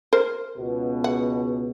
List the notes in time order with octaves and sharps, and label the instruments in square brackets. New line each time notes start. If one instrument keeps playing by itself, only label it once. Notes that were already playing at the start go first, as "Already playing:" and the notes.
[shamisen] A#4 C5
[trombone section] C#2 B2
[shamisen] F#5